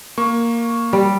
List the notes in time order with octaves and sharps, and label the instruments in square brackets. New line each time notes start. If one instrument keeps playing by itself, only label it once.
[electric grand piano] A#3 C#6
[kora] G3